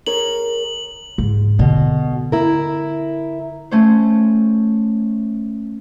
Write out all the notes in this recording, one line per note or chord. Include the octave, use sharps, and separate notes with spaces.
G#4 A#4 C#5 F#7
G#2
B2 D3
E4 A#4
A3 C#4 C5